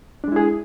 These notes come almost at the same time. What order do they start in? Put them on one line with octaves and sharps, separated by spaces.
D4 G#3 E4 G#4